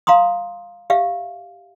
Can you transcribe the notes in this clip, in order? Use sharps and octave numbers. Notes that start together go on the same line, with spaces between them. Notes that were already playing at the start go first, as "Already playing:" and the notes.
F5 A#5 C6 D#6
G4 E5 F5